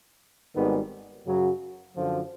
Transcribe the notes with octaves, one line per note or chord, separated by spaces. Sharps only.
G#1 G#2 D#3 G3 B3
F#2 C#3 F#3
F#2 D3 F3